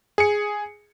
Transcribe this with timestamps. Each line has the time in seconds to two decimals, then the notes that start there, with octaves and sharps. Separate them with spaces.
0.18 G#4 C#7